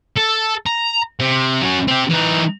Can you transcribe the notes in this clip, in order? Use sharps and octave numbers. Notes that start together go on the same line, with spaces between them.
A4
A#5
C3
F#3 C#4
C4 G4
E3 D#4